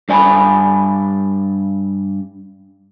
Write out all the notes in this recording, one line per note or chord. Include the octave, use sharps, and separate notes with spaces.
G2 D5 G#5 A#5 B5